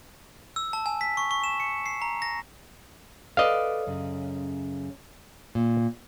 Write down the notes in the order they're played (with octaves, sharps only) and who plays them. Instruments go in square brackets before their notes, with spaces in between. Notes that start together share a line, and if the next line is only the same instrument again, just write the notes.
[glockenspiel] E6
A5
G#5
B6
C#6
C#6
E7
C#7
C7
A#5
A#6
[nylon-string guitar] A4 B4 D5 [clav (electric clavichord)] D#5 F5
[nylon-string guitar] F#2 C#3
A#2